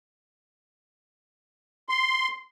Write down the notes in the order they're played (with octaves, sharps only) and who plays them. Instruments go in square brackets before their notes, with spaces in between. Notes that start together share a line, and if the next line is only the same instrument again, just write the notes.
[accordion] C6